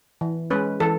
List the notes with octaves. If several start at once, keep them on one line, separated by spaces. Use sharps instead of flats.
E3
G#3 C#4 B4
E3 A4